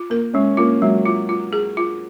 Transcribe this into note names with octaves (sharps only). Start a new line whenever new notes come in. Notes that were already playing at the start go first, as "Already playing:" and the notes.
Already playing: F4
A#3 A#4
G#3 C#4
A#3 F4
F#3 G#3
F4
F4
G#4
F4